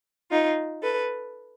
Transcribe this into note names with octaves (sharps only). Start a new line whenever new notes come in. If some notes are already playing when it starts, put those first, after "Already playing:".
D#4 F4
A4 B4